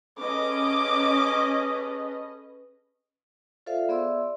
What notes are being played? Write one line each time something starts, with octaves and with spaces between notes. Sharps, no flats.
C#4 G#4 A4 B4 D#5 D6
F4 A4 C5 D5 E5 F5
B3 G#4 D5 E5 C6 E6